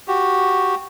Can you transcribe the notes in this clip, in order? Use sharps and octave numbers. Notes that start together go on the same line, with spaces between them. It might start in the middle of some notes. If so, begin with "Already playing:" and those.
F#4 G4